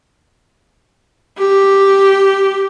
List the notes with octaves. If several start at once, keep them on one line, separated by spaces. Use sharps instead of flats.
G4